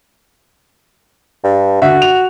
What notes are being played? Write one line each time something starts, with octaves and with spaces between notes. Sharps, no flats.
G2
D3 F#4 E5
F7